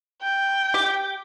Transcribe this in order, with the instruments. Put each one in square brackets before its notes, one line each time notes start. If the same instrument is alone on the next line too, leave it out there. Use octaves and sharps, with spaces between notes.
[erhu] G5
[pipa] G4